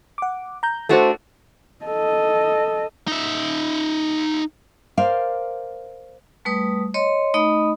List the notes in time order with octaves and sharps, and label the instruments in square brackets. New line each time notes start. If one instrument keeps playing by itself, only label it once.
[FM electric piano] F#5 D6
A#5 G6
[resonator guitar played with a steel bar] A3 D4 F#4 [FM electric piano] A4 C5
[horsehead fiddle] A4 D#5
[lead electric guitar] D#4 E5
[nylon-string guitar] A#4 C5 D5 F5
[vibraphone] G3 A3 B4 D#6
C#5 D#5 C6
A3 D#4 D#5 B5 D#6